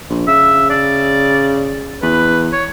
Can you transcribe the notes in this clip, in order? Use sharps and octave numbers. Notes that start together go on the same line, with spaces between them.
A#1
C#3 E5
D5
E2 B4
C#5